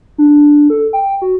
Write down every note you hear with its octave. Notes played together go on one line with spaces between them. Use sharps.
D4
A4
G5
F#4